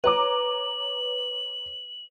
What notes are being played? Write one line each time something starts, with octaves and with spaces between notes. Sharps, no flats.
B4 C#5 A#5 D6 F#7